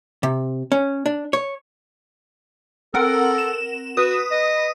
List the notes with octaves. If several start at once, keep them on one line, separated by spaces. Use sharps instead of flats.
C3
C#4
D4
C#5
C4 A4 A#4 F#5
E7
F#4 B4 D#6
D#5